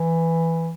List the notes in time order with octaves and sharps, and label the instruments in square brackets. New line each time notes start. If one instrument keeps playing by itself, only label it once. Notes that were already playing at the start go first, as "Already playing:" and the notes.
Already playing: [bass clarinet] E3